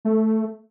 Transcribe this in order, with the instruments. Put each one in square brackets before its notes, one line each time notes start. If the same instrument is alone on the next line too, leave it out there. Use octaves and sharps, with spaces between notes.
[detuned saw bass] A3